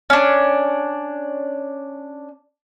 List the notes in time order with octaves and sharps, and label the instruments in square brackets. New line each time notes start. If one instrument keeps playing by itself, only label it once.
[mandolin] C#4 D4